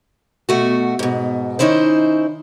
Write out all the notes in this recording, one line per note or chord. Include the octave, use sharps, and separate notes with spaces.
B2 A3 F#4
G#2 B2
D#3 C#4 D#4 E4 C5